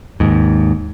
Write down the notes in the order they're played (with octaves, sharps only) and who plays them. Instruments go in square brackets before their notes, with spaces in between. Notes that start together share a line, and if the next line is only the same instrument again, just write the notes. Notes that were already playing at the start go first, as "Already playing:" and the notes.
[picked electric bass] D#2 G#2